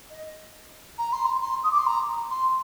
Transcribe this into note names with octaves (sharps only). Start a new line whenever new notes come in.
D#5
A#5
C6
A#5
C6
D#6
D6
C6
A#5
C6